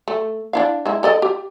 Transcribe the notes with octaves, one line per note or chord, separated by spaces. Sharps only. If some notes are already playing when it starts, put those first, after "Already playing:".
A3
D4 E4 F5
G#3 E4
A4 D5 D#5
G4